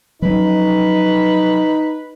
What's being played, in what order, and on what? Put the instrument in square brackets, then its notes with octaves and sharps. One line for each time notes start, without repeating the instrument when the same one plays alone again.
[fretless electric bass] F3 F#3 C#4 [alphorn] D#4 [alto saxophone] B4